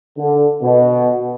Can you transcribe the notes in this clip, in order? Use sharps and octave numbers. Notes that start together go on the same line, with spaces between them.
D3
B2